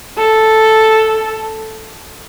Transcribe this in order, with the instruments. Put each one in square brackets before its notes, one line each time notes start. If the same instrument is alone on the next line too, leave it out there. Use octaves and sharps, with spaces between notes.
[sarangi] A4